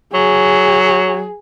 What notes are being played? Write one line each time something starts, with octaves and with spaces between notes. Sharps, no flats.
F#3 G#4